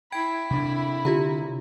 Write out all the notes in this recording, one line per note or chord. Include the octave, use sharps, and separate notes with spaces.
E4 G5 B5 G#6 D7
C3 D4
D3 F4 G4 A#5